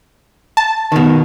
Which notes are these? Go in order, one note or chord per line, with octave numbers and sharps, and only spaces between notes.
A5
B2 D#3